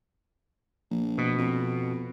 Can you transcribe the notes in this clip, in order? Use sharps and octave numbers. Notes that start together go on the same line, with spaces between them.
A#1
B2
F2